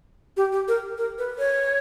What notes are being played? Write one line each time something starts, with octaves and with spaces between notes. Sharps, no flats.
G4
G4
A#4
A#4
B4
C#5